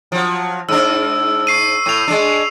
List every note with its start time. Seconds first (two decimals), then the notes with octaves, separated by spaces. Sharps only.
0.12 F3 F#3
0.69 G#2 D4 E6
1.47 C#6 C7 D#7
1.86 A2 C#6 F7
2.08 G#3 D4